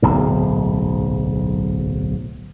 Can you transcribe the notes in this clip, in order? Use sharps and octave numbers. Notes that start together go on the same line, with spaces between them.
D1 B1 G#2